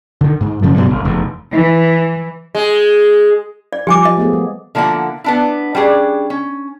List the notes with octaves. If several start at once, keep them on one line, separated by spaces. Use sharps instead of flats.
D3 D#3
G#2
F#2 C#3 F3
G2 B2 F#3 G3
G1
F1 E2
E3
G#3
D5
F3 G3 G4 G#5 D6
D#5
A3 B3 G#4
G#3
D3 F3 A#3 E4 F#5
B3 D4 E4
G3 C#4 D4 G#4
C#4